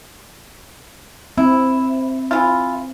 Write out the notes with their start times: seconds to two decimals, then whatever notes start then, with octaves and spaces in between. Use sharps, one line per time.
1.38 C4 E4
2.31 E3 F4